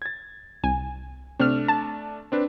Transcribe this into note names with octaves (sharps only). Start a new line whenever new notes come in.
G#6 A6
C2 G#5
C3 A3 D4 F6
A5
C4 D4 B4